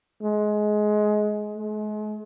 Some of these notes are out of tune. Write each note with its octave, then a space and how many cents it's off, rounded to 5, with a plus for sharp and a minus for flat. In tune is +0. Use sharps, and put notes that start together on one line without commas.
G#3 +20
G#3 +40